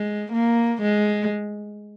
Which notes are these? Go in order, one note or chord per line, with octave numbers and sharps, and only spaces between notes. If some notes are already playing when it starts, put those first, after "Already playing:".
Already playing: G#3
A#3
G#3